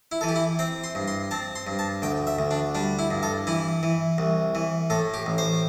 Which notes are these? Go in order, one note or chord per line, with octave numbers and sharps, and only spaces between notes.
E4
E3 A4
G4
E4
C4 G5
C6
G2
C6
C4 A5
C6
G2
A5
D2 G5
E5
D2
D4
G3 D4
E4
G2
A4
E3 E4
E3
C2
E3
A2 A4
G4
A1
C5